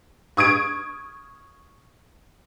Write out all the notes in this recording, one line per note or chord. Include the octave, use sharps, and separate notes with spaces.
C#6 D#6 G#6 D7